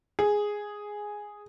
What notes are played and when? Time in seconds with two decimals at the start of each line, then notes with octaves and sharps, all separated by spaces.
0.19 G#4